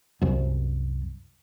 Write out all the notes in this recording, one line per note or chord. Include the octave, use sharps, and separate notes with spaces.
C2 F#2